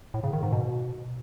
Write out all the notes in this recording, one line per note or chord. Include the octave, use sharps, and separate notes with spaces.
A2
C#3
D#3
G#2
B2